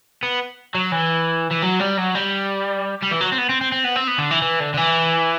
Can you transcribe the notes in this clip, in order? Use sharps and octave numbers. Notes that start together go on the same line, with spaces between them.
B3
F#3
E3
E3
F#3
G3
F#3
G3
G3
E3
F#3
C4
B3
C4
C4
C4
B3
C4
B3
D3
E3
E3
D3
D3
E3